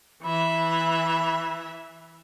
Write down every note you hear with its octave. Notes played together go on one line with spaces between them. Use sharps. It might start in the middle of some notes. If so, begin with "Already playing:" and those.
E3 E5 B5